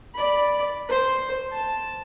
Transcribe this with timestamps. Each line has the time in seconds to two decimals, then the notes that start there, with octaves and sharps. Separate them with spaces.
0.15 D5 B5
0.89 C5
1.52 A5